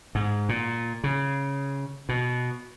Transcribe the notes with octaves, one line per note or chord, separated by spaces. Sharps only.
G#2
A#2
C#3
B2